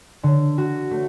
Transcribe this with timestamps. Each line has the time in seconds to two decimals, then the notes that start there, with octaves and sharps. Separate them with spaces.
0.23 D3
0.58 F#4
0.91 A3